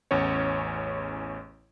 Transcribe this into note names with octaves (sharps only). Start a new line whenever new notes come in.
A1 E2 C#4 C#5